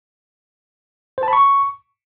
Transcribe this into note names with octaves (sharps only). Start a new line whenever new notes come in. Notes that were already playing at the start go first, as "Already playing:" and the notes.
C5
A5
B5
C#6